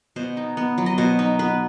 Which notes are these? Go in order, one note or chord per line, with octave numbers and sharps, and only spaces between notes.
B2 C5
D#4
B3
F#3
D#5
B2 C5
D#4
B3 B4